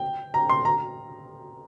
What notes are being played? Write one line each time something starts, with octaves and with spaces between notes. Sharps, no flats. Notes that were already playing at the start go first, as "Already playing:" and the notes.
Already playing: G5
A#5
C6
A#5